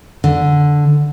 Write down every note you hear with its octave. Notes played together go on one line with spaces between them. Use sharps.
D3